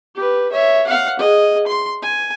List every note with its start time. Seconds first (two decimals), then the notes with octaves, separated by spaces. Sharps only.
0.15 G4 B4
0.52 C#5 E5
0.87 F5 F#5
1.19 G#4 D#5
1.67 C6
2.03 G#5